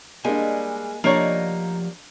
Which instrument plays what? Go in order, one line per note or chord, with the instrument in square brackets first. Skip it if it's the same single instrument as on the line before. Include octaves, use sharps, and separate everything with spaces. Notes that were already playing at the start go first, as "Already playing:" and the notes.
[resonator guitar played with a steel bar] G3 [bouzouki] G#3 [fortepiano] A#3 D4 [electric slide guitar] G#5
[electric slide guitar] F3 G4 [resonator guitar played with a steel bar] A#3 C#5 D5 [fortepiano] D4 [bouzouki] D#4